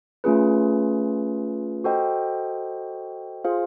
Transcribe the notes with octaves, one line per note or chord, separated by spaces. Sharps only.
A3 C#4 F4 G#4 B4
F#4 A4 C5 D#5 G5
F4 G#4 C5 F5